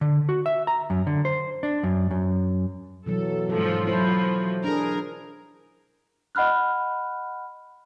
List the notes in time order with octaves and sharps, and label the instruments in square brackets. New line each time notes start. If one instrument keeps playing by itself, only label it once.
[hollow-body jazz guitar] D3
F#4
E5
A#5
F#2
D3
C5
D4
F#2
F#2
[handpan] B2 E3 F#3 [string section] A4
[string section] G#2 F3 [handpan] A4
[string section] F3 F#3 [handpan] E4 C5
[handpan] D4 G#4 [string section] A#4
[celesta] D#5 F#5 B5 F6 F#6